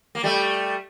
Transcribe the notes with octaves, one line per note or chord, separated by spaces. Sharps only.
A#3
G3 A3